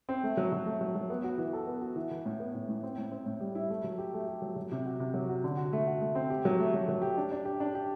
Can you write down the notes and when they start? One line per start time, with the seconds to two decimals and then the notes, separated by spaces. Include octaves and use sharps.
0.09 C4
0.23 A3
0.37 F#3
0.52 F#3
0.66 A3
0.81 F#3
0.96 F#3
1.10 B3
1.24 F#4
1.38 E3
1.53 A4
1.67 B3
1.81 F#4
1.96 E3
2.11 E3
2.26 A2
2.40 B3
2.55 A2
2.69 A2
2.83 C4
2.98 A2
3.12 C4
3.26 A2
3.40 G3
3.55 E4
3.70 A3
3.84 F#3
3.98 G4
4.14 A3
4.28 G4
4.42 F#3
4.56 F#3
4.72 C3
4.86 F#4
4.99 C3
5.14 F#3
5.29 F#4
5.44 D3
5.57 F#4
5.73 A3
5.87 F#4
6.01 A3
6.15 C4
6.30 G4
6.45 F#3
6.60 A3
6.74 F#3
6.88 F#3
7.02 G4
7.17 D4
7.32 D4
7.45 G4
7.60 D4
7.75 G4